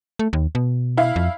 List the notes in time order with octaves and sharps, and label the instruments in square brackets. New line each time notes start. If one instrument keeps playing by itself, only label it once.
[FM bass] A3
D#2
B2
[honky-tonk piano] E4 F5
[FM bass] F2